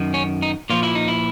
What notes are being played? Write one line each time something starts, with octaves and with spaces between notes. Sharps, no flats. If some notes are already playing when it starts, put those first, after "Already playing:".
Already playing: F#2 D#3
C#4
D#4
A#2 F3 F4
E4
D#4
E4